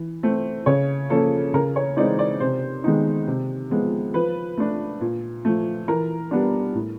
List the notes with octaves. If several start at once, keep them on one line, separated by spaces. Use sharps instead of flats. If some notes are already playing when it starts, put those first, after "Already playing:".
Already playing: E3
A3 C4
C#3 C#5
F3 A#3 C#4 A4
C#3 A#4
C#5
E3 G#3 C4 D#4 D5
D5
C3 C5
D#3 G#3 B3 D#4
C3
F3 G#3 B3
F3 B4
A3 D4
A#2
F3 A3
E3 A#4
G3 B3 D4
A2